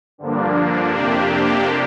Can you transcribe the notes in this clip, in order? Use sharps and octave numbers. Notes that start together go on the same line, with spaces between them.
G2 D3 F3 A#3 D4
F2 C3 A#3 D4 G4